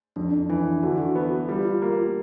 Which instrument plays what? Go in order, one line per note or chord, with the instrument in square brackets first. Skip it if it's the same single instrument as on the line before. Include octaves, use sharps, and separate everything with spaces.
[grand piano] F2 [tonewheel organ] D4
[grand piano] E3 [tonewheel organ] D4
[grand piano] D3 [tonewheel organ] F#4
[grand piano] B3
[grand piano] G3 [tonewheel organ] F4
[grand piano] A#3